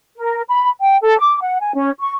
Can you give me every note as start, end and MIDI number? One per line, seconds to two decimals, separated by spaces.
0.17 0.42 70
0.48 0.68 83
0.80 0.97 79
1.02 1.19 69
1.19 1.39 86
1.41 1.58 78
1.61 1.73 80
1.75 1.91 61
2.00 2.14 85